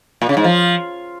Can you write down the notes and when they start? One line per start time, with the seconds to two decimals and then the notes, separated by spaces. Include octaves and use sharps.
0.22 A#2
0.29 C#3
0.37 G#2
0.44 F3